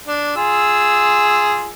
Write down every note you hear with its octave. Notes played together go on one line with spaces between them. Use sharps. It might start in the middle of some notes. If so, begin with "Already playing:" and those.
D4
F4 G#4 E6